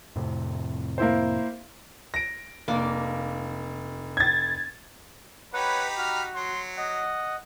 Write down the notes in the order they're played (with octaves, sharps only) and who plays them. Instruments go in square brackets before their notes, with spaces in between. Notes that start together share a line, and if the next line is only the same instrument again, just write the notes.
[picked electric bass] F2 A2 C3
[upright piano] A#3 E4 C5
[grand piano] A#6 D7
[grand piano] F1 [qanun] A#3 D4 D6
[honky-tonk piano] G#6 A6
[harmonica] D#4 G4 B5 [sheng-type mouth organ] B4 F#5 [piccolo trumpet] C#5
[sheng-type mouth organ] F#4 [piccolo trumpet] F6
[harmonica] F#3 [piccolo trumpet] C6
[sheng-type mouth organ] D#5 [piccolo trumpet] F#5